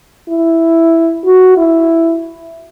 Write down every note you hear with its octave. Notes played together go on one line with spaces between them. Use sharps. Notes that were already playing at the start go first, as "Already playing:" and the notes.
E4
F#4
E4